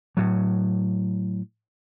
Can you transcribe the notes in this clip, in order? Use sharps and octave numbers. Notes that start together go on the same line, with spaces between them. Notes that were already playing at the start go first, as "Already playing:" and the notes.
A2 F#3